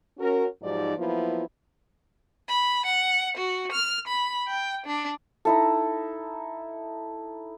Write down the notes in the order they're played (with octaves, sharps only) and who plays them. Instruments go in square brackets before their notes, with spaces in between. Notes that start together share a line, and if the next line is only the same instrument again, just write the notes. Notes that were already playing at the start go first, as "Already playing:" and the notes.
[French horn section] C#4 F#4 A#4
G#2 F3 F#3 D#4 G4 D5
F3 F#3 A#3 B3 E4
[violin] B5
F#5
F#4
F6
B5
G5
D4
[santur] D#4 E4 A4